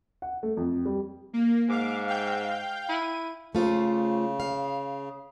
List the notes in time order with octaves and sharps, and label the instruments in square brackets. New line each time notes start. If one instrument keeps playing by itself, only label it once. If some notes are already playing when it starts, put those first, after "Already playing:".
[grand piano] F#5
A3
F2
G3
[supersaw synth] A#3
[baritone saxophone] G#2 [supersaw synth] F5 D6
[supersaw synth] F5 G5 G6
[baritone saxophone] E4 [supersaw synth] D#7
[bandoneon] C#3 [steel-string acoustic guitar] A3 F4 C5
[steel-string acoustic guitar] F5